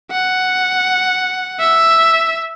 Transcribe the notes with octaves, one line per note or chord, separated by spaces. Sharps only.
F#5
E5